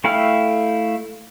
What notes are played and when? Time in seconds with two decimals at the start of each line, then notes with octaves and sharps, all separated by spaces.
0.04 A3 E4 F5 G5 F6